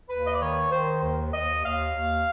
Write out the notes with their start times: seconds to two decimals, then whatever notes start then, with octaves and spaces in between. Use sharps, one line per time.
0.10 D#2 B4
0.27 D#5
0.34 D5
0.41 D#3 C#5
0.72 D#3 C5
1.03 D#2
1.33 D#2 D#5
1.64 D#2 F5
1.95 D#2